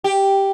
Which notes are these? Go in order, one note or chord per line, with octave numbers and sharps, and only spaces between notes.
G4